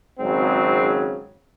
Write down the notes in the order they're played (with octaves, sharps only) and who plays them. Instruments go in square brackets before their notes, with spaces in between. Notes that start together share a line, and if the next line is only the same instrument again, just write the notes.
[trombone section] G#1 G#2 C#3 F#3 C4